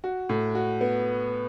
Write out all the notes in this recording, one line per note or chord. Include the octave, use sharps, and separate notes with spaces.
F#4
A2
F#4
B3